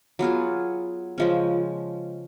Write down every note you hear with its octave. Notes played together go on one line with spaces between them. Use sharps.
F#3 B3 F4 G#4
C#3 F3 G#3 C#4